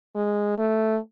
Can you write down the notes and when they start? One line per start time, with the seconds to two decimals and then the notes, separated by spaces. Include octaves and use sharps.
0.16 G#3
0.58 A3